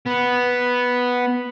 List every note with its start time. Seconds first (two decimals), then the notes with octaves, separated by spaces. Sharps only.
0.06 B3